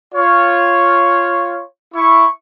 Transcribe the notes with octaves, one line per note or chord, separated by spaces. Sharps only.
F4 C#5
E4 C#6